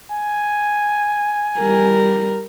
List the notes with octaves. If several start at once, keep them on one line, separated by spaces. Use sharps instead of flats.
G#5
G3 A#4